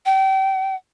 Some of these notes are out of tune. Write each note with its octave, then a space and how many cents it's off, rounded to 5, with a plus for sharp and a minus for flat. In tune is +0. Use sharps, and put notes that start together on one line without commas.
G5 -30